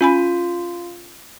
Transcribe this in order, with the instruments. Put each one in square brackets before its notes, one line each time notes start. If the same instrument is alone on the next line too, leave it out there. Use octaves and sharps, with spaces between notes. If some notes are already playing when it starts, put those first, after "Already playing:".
[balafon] C#4 G#5 B5 [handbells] F4